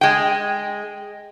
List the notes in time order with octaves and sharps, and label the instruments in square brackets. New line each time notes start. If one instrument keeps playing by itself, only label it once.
[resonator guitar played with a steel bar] G#3 G5